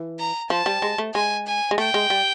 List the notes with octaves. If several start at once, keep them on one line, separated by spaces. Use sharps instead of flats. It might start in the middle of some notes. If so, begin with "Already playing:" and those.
Already playing: E3
A#5
F3 A5
G3
G#3
A3
G#3 G#5
G#5
G#3
A3 G5
G#3
G3